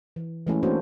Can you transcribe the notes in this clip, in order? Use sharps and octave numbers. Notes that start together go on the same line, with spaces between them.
E3
E3 G#3 A3 C#4 E4
A3 A#3 C4 D4 F#4 C5